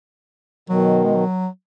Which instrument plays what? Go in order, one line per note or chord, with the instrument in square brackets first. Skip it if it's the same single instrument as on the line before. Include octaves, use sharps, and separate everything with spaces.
[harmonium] B2 D#3 [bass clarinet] F#3
[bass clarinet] G#3
F#3